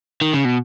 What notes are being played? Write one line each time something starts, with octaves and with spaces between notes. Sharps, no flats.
D#3
C#3
B2